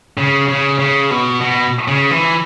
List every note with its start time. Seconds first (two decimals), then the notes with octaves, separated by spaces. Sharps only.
0.18 C#3
0.49 C#3
0.79 C#3
1.11 B2
1.41 B2
1.88 C#3
2.11 E3